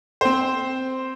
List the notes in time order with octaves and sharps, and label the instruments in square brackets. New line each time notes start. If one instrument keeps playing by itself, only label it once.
[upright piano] C4 C5